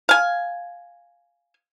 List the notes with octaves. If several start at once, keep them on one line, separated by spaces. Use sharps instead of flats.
F5 G#5